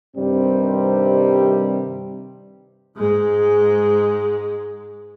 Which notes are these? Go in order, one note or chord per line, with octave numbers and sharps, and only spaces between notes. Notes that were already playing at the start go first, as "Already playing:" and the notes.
G2 C3 D#3 G3 C4
G#2 G#3